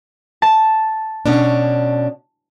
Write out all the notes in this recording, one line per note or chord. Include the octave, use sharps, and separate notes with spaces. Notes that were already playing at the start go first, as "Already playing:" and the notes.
A5
B2 C#4 D4